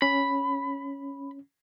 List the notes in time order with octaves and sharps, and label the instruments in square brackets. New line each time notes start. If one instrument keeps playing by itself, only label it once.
[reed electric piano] C#4 [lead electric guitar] B5